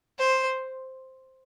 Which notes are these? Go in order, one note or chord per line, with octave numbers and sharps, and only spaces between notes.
C5